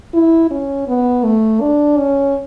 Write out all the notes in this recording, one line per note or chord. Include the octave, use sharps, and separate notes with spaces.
E4
C#4
B3
A3
D4
C#4